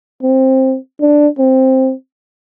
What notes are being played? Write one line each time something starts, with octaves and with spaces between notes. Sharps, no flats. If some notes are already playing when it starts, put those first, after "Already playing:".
C4
D4
C4